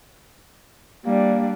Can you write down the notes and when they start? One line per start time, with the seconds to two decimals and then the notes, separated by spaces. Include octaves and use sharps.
1.06 G3 A#3 D4